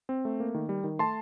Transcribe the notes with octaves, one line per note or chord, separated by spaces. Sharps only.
C4
A3
A#3
D#3
G3
D#3
A3 A5 C6